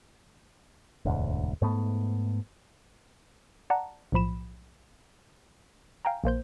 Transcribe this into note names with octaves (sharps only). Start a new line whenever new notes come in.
E1 D2 G#2
G#2 A3 B3
D5 F#5 A5 A#5
B1 A2 F3 B5 E7
F5 G5 G#5 A#5
A#1 A#3 C5 G6